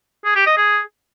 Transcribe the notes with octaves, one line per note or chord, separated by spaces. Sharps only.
G#4
G4
D#5
G#4